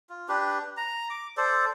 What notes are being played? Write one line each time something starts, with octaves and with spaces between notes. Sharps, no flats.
F4
D4 G4 B4
A#5
D6
A4 C5 D5